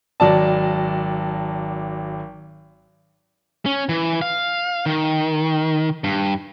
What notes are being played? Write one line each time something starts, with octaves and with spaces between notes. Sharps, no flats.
G#1 F#3 D5 A5
C#4
E3
F5
D#3
G2